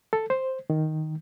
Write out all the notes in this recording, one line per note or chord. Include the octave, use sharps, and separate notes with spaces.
A4
C5
D#3